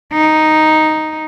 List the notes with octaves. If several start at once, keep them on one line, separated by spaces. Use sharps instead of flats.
D#4